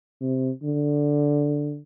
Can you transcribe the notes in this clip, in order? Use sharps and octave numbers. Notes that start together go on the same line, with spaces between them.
C3
D3